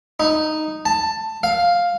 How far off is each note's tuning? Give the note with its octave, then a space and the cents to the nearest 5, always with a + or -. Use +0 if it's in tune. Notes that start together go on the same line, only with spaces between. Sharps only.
D#4 -5
A5 +15
F5 +5